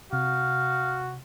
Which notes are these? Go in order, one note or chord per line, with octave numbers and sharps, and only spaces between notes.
C3 F#4 F5